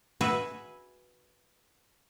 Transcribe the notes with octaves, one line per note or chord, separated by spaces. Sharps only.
F#4 G#4 B4 E5